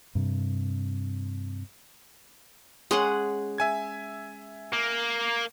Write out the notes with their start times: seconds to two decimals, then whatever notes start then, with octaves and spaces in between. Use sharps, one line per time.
0.15 G2 C3
2.91 G#3 C#4 G#4 F#5 C6
3.58 E5 G#5 G#6
4.73 A#3